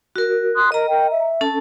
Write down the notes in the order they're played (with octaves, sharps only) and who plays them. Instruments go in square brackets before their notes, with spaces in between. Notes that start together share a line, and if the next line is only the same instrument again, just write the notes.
[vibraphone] F#4 A#4
[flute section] C6 D#6 F#6
[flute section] A#4 [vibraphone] D#5 A#5
[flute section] A#4 G5
E5
[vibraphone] C#4 A4 A5